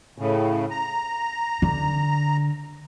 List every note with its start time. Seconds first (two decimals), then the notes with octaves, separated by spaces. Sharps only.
0.18 A2 C#3
0.70 A#5
1.62 D3